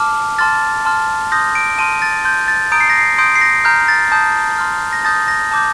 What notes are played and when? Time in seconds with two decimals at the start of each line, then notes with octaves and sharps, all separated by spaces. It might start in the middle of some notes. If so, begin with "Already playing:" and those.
Already playing: A5 D6 F6
0.39 A5 C6 F6 A6
0.85 A5 C6 F6
1.32 C6 D#6 G6 A#6
1.55 D7
1.78 A5 C6 F6 D#7
2.02 A6
2.25 C6 G6
2.48 A6
2.72 A#5 D#6 G6 D7
2.80 C7
2.90 A#6
2.98 C7
3.18 C6 D#6 G6 D7
3.35 C7
3.41 A#6
3.65 A#5 F6 G6
3.88 A6
4.12 A5 D#6 G6
4.58 C6 F6
4.93 A#6
5.04 A5 D#6 G6 A6
5.28 A#6
5.51 A5 D6 G6